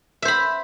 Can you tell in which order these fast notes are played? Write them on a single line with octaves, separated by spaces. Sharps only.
E5 C5 B5